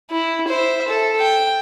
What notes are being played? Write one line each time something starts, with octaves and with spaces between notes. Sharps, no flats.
E4
C5 E5
A4
G5